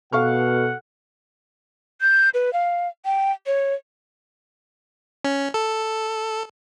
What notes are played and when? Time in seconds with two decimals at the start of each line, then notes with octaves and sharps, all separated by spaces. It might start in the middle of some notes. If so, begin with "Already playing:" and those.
0.13 B2 A4 F5 F#5 C#6 F6
2.01 G6
2.34 B4
2.53 F5
3.05 G5
3.47 C#5
5.25 C#4
5.54 A4